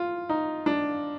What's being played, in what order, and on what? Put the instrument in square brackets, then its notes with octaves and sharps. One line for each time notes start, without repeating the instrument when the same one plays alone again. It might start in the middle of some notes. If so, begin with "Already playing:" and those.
Already playing: [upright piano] F4
D#4
D4